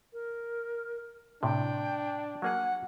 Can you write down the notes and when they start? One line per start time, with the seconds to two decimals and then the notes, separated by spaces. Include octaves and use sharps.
0.13 A#4
1.43 A2 C3 D4 G5
2.42 F#3 A#3 G#4 F#5